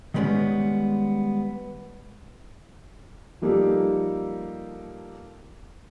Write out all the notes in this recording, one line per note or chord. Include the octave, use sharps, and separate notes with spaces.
D#3 G3 G#3 B3 C#4
F3 G3 A#3 D#4 G4 A4